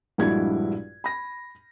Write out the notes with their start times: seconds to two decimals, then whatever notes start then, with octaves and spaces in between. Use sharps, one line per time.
0.18 A#1 G2 G#3 E4 F#4 G#6
1.04 B5 A#6